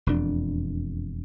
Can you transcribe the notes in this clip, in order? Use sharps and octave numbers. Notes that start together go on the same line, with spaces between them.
E1 F2 D4